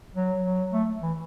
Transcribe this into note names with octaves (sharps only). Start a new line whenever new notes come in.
F#3
F#3
A3
E3